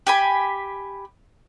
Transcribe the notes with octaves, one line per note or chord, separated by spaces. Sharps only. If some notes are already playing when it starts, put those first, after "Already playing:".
G4 G#5 B5